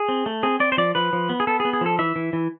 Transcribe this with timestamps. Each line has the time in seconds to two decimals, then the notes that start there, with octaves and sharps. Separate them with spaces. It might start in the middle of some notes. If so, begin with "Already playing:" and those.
Already playing: G#4
0.09 C4
0.26 A3
0.43 C4 G#4
0.60 C4 D5
0.72 C5
0.78 F3 D5
0.95 F3 B4
1.13 F3
1.29 B3
1.40 G#4
1.47 B3 A4
1.60 G#4
1.65 B3
1.73 G#4
1.81 F3 A4
1.99 E3 E5
2.16 E3
2.33 E3